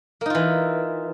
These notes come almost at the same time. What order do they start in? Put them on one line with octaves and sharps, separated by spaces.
A#3 D#4 F4 E3